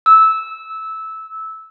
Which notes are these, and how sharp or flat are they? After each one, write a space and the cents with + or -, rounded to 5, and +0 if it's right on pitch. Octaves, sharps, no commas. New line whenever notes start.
E6 -15